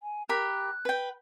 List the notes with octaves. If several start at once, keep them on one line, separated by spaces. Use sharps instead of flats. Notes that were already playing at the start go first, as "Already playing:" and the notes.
G#5
G4 A#4 B5 F#6
B4 G5